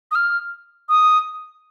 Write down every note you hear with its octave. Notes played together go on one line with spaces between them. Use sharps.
D#6
F6
D#6